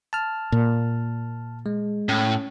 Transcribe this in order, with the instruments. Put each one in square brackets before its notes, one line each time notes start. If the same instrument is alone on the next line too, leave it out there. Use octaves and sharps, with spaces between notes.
[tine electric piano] A5 F6
[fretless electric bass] A#2
[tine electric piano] G#3
[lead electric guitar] A2 [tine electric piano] C#4